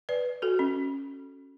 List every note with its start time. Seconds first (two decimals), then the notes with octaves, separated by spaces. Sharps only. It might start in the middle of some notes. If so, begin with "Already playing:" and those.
0.09 B4 D5
0.42 F#4 A4
0.59 C#4